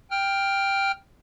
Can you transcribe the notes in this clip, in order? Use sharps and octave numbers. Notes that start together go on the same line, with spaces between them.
G5 F6